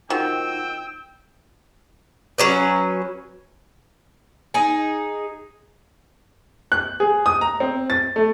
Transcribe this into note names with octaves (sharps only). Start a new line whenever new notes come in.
D#3 F4 F#4 C5 G5 E6
F#3 C#4 B4
D#4 G#4
F#6
G#4
D#6
A#5
C4
A6
A3